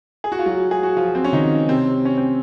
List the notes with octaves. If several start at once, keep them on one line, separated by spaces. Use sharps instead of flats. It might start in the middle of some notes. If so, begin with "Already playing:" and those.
G#4
F#4
F4
F#3 F#4
G#4
F#4
F3 F4
C4
C#4
D#3 D#4
C3 C4
C#4
C4